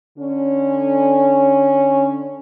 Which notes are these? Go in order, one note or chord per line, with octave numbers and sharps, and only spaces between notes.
D3 C#4